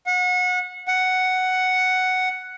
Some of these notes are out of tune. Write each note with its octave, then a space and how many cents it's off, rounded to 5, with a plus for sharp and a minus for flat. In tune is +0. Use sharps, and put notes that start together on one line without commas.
F#5 -30
F#5 +5